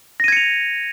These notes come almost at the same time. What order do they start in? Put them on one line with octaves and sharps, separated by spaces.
A#6 D#7 G#6 C#7 F7